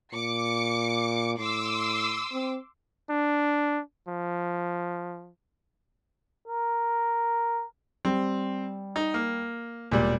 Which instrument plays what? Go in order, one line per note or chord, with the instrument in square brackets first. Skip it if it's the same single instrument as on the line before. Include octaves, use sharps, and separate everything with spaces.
[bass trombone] A#2 [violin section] D6 C#7
[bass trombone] A2 [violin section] C6 D6 E6
[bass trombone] C4
[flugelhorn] D4
F3
[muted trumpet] A#4
[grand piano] G3 [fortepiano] C4
[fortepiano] D#4
A#3
[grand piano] E1 [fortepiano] A#2 G3